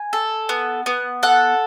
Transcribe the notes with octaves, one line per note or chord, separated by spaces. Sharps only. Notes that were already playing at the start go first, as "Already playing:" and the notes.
Already playing: G#5
A4
B3
B3
A4 F#5